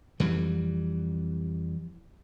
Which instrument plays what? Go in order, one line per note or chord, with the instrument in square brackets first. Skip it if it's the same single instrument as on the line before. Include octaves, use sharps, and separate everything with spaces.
[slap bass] F2 E3 G3